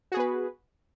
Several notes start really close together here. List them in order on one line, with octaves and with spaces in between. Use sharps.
F#4 G#4 B3 B4